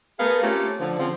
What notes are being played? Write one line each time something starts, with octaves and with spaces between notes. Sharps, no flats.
A3 B3 G#4 A#4 F5
A3 A#3 C4 C#4 F4 G4
D3 F3
C#3 F3 C4